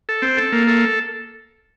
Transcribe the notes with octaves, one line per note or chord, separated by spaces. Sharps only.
A4
C4
A4
A#3
A4